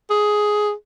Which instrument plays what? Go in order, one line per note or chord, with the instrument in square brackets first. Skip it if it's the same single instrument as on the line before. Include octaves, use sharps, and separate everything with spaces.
[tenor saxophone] G#4